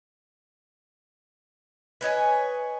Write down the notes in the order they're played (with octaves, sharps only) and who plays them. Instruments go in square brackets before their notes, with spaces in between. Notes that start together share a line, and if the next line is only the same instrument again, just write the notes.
[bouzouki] B4 C#5 D#5 G#5